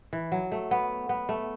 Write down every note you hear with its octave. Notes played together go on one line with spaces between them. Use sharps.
E3
F#3
A3
B3
B3
A3